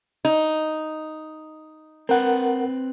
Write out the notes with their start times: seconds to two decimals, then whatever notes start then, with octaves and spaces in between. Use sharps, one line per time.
0.25 D#4
2.09 C4 A#4 B4 F#5